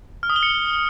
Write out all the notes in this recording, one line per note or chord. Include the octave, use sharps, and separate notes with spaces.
F6
D#6
G7
C#7